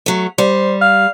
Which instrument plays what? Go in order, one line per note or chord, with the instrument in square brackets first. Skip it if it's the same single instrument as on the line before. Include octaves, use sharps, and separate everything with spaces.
[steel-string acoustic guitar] F#3 A3
[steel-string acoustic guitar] G3 [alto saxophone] C5
[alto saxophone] F5